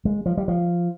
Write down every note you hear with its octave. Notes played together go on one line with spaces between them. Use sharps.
G#3
F3
G3
F3